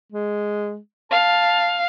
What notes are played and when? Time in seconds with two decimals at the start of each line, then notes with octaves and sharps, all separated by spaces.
0.12 G#3
1.11 F5 A5